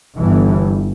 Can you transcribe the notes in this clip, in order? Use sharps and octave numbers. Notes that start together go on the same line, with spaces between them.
G1 G2 E3